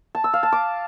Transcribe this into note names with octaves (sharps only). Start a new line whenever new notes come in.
A5
E6
F5
A5
D6